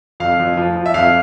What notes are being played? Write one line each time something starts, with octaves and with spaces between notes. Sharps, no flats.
F2 F5
F2
F3
F3
E5
F2 F5